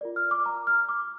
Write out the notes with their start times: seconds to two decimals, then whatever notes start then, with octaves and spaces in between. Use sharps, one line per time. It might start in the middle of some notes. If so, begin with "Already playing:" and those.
0.01 F4 A#4 D5
0.16 F6
0.31 D6
0.46 A#5
0.67 F6
0.89 D6